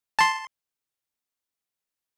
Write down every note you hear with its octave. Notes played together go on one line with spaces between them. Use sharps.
A5 C6